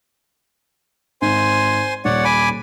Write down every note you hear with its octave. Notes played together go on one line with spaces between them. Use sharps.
G#1 C5 G#5 C6
D#1 C#5 D5 F#5
G#5 B5 D6